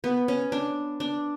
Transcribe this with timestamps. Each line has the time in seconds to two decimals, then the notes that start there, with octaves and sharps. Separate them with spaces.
0.04 B3
0.28 C#4
0.52 D4
1.00 D4